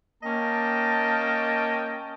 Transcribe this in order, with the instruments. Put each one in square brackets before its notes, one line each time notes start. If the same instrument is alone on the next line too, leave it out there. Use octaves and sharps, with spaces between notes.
[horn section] A#3 C#4 D#5 G5 A5